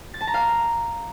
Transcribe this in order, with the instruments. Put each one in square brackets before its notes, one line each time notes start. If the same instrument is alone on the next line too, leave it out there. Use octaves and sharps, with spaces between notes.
[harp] A6
A5
A#5
F5